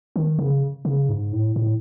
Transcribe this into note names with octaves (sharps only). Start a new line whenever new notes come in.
D#3
C#3
C#3
G#2
A2
A2